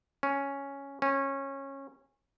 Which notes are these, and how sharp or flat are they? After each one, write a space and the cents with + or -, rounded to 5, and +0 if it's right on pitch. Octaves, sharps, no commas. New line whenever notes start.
C#4 +0
C#4 -20